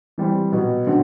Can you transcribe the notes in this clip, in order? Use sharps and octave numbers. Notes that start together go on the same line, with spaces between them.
E3 G3 C4
B2 F#3 B3
D3 F#3 C4 F#4